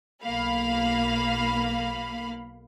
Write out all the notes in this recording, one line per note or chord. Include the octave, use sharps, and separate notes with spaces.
B1 A#3 F5 B5